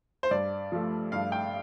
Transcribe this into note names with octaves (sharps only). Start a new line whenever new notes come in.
C5
G2 D5
F3 A3
G2 F5
G5